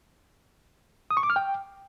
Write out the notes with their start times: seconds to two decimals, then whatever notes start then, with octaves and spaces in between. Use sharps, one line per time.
1.11 D#6
1.17 C#6
1.23 D6
1.30 F6
1.36 G5